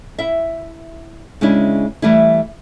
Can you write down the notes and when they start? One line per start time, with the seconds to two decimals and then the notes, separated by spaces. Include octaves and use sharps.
0.18 E4 E5
1.41 C#3 G#3 C#4 D4 E4
2.02 E3 G3 A3 E4